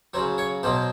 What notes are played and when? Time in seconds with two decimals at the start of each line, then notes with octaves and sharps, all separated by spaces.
0.14 F#3 C5
0.17 C#3
0.38 C#5
0.63 B2 F#3 C5